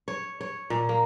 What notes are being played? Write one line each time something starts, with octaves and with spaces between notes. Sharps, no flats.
C#5
C#5
A#2
A#3